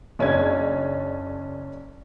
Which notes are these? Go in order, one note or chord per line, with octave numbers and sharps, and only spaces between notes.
F#1 C#4 D4 G#6